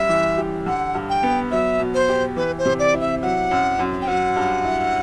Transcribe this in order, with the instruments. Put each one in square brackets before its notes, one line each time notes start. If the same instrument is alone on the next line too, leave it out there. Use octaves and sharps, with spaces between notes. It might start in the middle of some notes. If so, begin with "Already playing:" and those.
Already playing: [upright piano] F#2 G3 [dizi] E5
[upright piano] E3
G4
[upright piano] D3 [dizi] F#5
[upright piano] G2
[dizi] G5
[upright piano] B3
[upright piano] F#3 [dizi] E5
[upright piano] B2
[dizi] C5
[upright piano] G4
[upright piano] E3 [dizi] B4
[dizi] C5
[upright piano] C3
[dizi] D5
[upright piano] E4
[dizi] E5
[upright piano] F#3 [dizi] F#5
[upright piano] F#2
F#2
[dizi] G5
[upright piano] F#3 [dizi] F#5
[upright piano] G2
E4